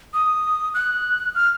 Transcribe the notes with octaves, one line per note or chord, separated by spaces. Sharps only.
D#6
F#6
F6